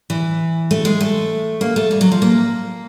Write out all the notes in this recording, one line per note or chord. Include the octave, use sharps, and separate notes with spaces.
E3
A3
G#3
A3
A#3
A3
G3
F#3
F3
A#3